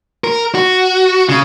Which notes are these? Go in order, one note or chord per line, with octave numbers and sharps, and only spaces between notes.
A#4
F#4
C#3